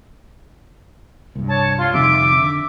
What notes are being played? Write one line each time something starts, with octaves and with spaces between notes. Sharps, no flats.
C2 G2
C#5 A5
F4 C6
F2 C3 D#3 E5 D6 D7
D3